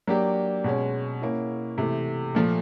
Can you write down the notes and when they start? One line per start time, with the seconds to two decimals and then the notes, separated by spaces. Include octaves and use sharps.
0.07 F#3 A#3 D4 G4
0.64 B2 G#3 C#4
1.22 A#3 C#4 E4
1.78 C3 E3 A3
2.35 A#2 F3 A3